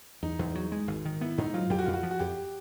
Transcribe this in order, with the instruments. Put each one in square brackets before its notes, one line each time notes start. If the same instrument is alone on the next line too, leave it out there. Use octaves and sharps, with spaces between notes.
[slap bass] E2 [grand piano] D#4
[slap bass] E2
F#3
G#3
G#1
D#3
[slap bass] B3 [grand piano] E4
[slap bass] G#2 [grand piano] D#4
[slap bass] F#3 [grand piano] F4
[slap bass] F2 [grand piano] G4
[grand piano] F#4
[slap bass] F2 [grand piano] F4
[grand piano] F#4
[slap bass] F3
[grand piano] F#4
[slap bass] F2 [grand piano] G4